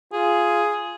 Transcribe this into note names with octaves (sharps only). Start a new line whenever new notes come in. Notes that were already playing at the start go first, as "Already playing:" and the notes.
F4 G#4